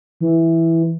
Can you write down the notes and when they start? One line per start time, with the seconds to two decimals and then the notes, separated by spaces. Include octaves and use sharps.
0.21 E3